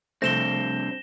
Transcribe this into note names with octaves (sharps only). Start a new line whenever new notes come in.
G2 C3 F3 A3 C4 A#6 E7 G7